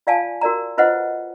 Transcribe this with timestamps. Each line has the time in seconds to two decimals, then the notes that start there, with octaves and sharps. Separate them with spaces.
0.07 F4 D5 F5 G#5 A5
0.41 F#4 A#4 D5 A#5
0.78 F4 B4 C5 D#5 F#5